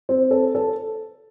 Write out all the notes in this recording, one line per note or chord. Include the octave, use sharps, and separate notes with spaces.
C4
A4
A4